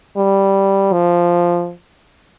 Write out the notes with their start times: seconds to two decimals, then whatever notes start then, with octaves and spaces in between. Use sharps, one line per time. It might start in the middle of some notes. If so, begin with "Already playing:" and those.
0.17 G3
0.93 F3